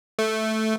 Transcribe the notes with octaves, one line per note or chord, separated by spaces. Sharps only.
A3